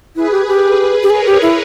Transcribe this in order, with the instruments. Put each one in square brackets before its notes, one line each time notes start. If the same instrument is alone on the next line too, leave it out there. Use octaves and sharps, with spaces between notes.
[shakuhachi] E4 [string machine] G#4 B4
[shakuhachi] G4
G4
[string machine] G#4 B4
[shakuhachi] G4
[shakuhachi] G#4 [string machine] A#4 C#5
[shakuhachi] G4
E4